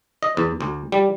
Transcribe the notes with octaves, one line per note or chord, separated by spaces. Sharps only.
D#5
E2
D2
G3